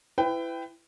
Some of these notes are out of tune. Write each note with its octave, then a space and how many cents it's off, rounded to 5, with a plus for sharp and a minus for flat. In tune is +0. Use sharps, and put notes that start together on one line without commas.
E4 +20 B4 +30 G5 +0